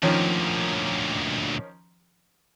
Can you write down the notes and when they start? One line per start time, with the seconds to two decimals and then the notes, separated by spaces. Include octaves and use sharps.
0.03 D2 A#2 D#3 F3 C#4